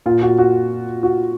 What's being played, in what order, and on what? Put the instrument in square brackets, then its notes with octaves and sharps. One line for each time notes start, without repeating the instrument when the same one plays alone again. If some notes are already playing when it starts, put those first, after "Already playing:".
[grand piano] A#2 F4
F#4
F#4
F#4